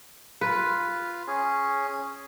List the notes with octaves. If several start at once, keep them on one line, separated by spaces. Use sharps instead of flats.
F4 B4
C#4 G#4